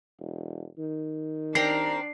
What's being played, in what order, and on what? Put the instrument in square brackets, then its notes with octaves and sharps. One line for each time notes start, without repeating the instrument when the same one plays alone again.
[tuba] E1
D#3
[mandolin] C4 G4 A#4 [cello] D4 [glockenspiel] C7